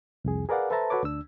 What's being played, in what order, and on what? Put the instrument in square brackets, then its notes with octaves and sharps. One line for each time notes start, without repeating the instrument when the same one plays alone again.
[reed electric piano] C2 F2 G#4
G#4 A#4 B4 D5 F5 F#5
A4 B4 C5 E5 A5 A#5
F#4 A4 B4 C#5 D6
D2 D4 E6